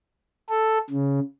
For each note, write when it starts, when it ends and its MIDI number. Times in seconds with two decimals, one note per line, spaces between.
0.50 0.78 69
0.90 1.19 49